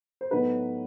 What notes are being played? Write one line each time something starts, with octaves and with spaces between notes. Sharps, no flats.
C5
A2 F#3 B3 D#4 B4